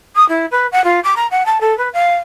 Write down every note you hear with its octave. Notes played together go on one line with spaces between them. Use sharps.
D#6
E4
B4
F#5
F4
D6
A#5
F#5
A5
A4
B4
F5